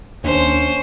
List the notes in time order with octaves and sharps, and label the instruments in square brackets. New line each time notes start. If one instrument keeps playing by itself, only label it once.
[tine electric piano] D#2 D4 [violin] C#4 C5